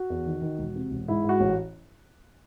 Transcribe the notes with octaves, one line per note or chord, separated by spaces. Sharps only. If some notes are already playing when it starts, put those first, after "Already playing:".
Already playing: F#4
E2
D#3
D#3
E1
C3
E1
G#2 E4
G#2
F#4
A1